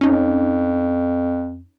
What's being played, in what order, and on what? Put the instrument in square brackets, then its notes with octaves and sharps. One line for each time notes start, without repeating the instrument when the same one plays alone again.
[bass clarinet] F2 [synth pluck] C#4 D#4